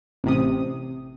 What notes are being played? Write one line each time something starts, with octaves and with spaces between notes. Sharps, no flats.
A1 C3 D#6